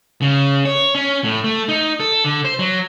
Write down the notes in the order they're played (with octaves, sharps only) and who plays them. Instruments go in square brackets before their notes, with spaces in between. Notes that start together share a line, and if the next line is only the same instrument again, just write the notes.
[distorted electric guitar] C#3
C#5
C#4
A2
A3
D#4
A4
D3
C5
F#3